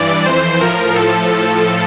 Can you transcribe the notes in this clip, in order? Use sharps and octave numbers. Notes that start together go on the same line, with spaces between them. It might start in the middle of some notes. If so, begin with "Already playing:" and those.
Already playing: G2 E3 D5
F2 E3 C5
A2 F3 A#4
A2 F3 A4